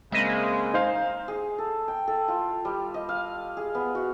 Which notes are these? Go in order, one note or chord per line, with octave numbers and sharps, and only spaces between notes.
C#3 G#3 A#3 C4 D#5 E5
D#4 C5 F5
G#4
A4
G5
A4
F4
G3
D#5
F5
G#4
B3
F#4